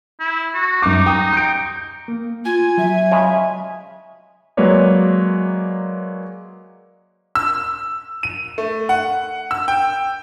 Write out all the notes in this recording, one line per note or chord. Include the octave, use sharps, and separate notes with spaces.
E4
F#4
F#2 D#4 D6
G5 A#5 D#6
G6 C#7 D7
A#3
F4 G#5
F#3 E5
C#3 G#3
F#3 G#3 A#3 B4 C#5 D5
E6
D#7
A3
F#5
E6
G5